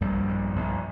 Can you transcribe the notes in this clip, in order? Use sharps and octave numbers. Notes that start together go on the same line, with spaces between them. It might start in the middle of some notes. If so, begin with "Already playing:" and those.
A#1 G2 G3
A#1
A#1